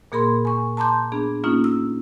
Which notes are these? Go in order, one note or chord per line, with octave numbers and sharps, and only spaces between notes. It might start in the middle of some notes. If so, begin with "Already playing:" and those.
A#2 A#3 G#4 A#4 B5 C6
G#5 C#6
A5 A#5 C6 D6 G6
B3 D4 G#4
A#3 C#4 D#4 F4
E6